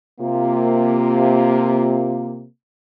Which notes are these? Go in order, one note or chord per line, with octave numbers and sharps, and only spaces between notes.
C3 A#3 F4